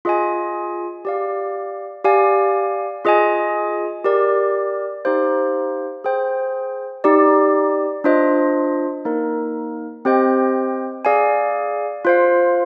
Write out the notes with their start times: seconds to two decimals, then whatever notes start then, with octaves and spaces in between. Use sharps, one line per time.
0.05 F4 G#4 D#5 G#5
1.05 G4 D5 F5
2.04 G4 D5 F5 G#5
3.05 F4 G#4 D#5 G#5
4.05 G4 A#4 D5
5.05 D#4 G4 C5 F5
6.04 G#4 C5 G5
7.04 D#4 G4 D5
8.04 D4 F4 C5 D#5
9.05 A#3 D#4 A#4
10.05 C4 G4 C5 D#5 G5
11.05 G#4 D5 F5 G#5
12.05 F4 C5 F5